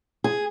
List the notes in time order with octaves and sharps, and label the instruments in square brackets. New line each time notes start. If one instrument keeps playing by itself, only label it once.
[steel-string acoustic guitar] G#4